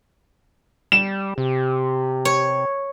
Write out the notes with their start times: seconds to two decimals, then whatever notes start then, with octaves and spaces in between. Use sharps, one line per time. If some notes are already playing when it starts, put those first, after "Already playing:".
0.92 G3 E7
1.38 C3 G4
2.25 C#5